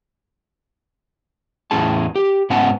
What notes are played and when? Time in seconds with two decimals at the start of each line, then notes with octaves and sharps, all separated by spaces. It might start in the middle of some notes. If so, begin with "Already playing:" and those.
1.71 E2 A2 C#4 G#4 A5
2.16 G4
2.50 G#2 B3 C#4 F#5 A5